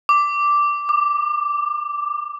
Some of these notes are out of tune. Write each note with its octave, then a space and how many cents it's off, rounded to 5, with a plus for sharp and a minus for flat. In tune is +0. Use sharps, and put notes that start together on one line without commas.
D6 -5
D6 +30